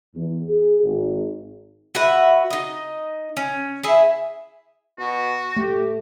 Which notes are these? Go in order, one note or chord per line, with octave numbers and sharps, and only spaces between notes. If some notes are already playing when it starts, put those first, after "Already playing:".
E2
G#4
G#1
F#4 B4 E5 F#5
D#4 D#5
C#4
E4 G#4 E5
B2 F#4
A3 G4